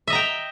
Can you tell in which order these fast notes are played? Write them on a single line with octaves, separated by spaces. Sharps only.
E5 D#5 A#5 G5